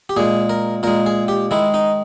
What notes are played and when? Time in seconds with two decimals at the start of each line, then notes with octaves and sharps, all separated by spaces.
0.09 G4
0.17 A#2 G#3 G#4
0.49 A#4
0.83 A#2 G#3 A#4
1.06 G#4
1.28 G4
1.51 D#3 G#3 E4
1.74 D#4